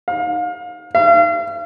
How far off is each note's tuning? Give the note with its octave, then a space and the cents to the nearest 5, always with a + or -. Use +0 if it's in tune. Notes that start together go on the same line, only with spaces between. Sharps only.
F5 +30
F5 -40